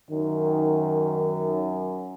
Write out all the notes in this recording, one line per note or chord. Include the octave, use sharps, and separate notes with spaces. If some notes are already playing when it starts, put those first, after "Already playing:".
F#2 D#3